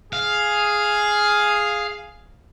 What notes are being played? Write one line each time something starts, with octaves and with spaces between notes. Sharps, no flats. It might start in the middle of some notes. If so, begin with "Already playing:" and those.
G#4 F5